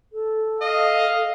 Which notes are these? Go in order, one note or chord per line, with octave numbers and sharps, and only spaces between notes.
A4
D#5 F5